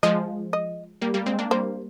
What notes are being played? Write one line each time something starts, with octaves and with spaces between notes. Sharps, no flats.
F3 G#3 D#5
D#5
G3 A#3
G3 A#3
G#3 C4
A#3 D4
G3 A#3 C5